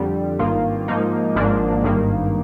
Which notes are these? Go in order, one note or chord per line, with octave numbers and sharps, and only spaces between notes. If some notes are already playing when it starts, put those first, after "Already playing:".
Already playing: F2 D3 G3
G#1 G2 D#3 A#3 F4
G#2 F3 A#3 D#4
G#1 G#2 F3 A#3 D4
G#1 G2 D#3 A#3